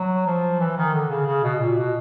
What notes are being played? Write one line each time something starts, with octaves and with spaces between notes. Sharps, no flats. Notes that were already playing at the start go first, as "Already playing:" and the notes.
Already playing: F#3
F3
E3
D#3
D3
C#3
C#3
B2
A#2
B2